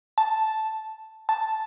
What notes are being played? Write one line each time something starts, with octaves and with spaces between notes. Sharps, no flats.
A5
A5